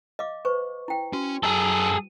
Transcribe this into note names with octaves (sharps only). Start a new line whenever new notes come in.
D#5 F5 D6
B4 C5 C#6
E4 G5
C#4 F#4
F#2 G#4 A4 A#5